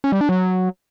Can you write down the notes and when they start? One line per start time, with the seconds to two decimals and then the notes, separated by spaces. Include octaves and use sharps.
0.04 C#4
0.12 G3
0.21 D4
0.29 F#3